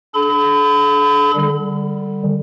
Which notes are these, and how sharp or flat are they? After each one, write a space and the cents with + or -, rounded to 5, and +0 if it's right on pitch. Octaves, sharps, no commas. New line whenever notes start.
D4 -10 A4 -45 B5 +35
D3 +20 G3 +0